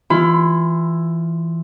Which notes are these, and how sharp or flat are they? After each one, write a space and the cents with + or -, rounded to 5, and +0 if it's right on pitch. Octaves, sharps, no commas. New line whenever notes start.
E3 +10 F4 +0 B5 +30